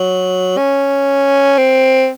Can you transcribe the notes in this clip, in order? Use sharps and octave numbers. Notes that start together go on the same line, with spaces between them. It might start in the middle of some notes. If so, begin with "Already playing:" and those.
Already playing: F#3
C#4
C4